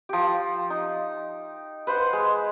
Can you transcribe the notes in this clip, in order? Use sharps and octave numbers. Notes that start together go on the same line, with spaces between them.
F3 G4
D#4
B4 C5 F#5 C6
G#3